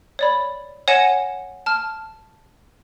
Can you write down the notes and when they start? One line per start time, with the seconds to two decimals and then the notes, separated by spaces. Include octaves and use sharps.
0.19 C#5 D5 B5
0.88 C#5 F#5 G#5 A#6 C#7 E7
1.66 A5 F6